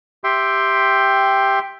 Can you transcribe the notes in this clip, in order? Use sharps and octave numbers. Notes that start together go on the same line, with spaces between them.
G4 E5 G5 C6